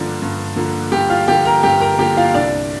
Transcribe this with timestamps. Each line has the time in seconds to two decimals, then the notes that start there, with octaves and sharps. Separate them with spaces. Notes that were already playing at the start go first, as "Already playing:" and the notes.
Already playing: G2 D3 F3 A#3 D4
0.22 G2
0.56 D3 F3 A#3
0.92 G2 G4 G5
1.10 F4 F5
1.28 D3 F3 A#3 G4 G5
1.45 A#4 A#5
1.63 G2 G4 G5
1.81 A#4 A#5
1.98 D3 F3 A#3 G4 G5
2.17 F4 F5
2.34 C2 D4 D5